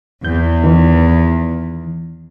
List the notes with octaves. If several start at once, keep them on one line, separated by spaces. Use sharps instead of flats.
E2 G6
D#3 E3